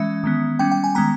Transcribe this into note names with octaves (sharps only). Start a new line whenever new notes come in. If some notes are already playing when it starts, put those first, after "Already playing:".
Already playing: E3 G#3 C#4 E5
D#3 G#3 B3
G3 C#4 G5
G5
G#5
D#3 G#3 B3 A#5